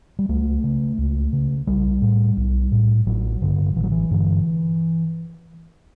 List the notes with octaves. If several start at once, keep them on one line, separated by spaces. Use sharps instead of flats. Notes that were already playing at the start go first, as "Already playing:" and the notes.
G3
C#2 A3
C#3
C#2
C#3
B1 G3
A2
B1
A2
A1 F#3
G2 D3
A1 E3
F#3
E3
G2 D3